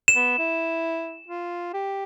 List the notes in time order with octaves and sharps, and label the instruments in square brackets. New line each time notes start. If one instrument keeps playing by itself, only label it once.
[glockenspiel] E7
[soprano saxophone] B3
E4
F4
G4